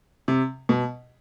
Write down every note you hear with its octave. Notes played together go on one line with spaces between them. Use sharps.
C3
B2